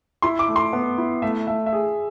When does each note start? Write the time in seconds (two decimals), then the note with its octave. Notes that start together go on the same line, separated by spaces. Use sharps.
0.22 E4 C6
0.39 D6
0.48 A3
0.56 C6
0.73 B3
0.98 E4
1.22 A3 E5
1.47 A3 E5
1.66 E5
1.73 G#4